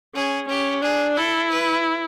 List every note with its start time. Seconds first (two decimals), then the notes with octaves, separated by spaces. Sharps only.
0.15 C#4 G#4
0.49 C#4 G4
0.82 D4 G#4
1.16 E4 A4
1.51 B4